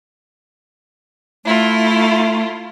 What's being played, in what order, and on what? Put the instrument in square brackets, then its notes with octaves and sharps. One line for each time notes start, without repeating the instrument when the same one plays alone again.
[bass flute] A3 [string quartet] E4 F4